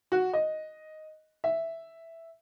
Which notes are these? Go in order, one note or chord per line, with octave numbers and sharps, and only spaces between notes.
F#4
D#5
E5